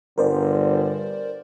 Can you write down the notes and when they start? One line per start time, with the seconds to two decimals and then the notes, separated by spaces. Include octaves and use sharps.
0.18 G1 A#4 C5 D5